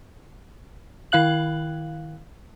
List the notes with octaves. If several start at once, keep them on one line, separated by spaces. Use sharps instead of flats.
D#3 E4 F5 F#6 F#7